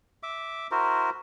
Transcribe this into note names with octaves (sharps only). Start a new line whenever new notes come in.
E5 D6
E4 F#4 A#4 C5